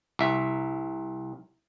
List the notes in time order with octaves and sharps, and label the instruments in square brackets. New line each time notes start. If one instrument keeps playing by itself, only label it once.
[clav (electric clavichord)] C2 E5